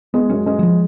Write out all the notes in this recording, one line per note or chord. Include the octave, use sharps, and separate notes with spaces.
G#3 B3
F#2 C#4
G#3 C#4
F#3
F3